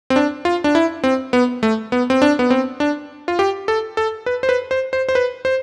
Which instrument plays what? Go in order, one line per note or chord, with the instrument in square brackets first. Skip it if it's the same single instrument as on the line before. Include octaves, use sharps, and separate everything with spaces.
[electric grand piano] C4
D4
F4
D4
E4
C4
B3
A3
B3
C4
D4
B3
C4
D4
F4
G4
A4
A4
B4
C5
B4
C5
C5
C5
B4
C5